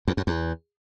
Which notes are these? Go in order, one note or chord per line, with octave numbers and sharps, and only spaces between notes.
E2
F#2
E2